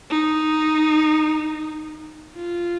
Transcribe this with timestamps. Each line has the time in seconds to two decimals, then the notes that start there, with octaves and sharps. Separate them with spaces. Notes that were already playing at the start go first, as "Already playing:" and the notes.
0.10 D#4
2.35 F4